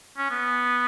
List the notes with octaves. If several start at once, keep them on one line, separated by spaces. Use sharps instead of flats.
C#4
B3